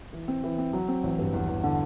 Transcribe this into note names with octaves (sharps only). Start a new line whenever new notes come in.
E3
C4
E3
C4
F#3
C4
A1
G2
E2
E2
D3